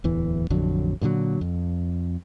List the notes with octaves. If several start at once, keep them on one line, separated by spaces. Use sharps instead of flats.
D1 E2 E3
A1 F2 D3 F#3
G2 A#2 D3 F#3
F2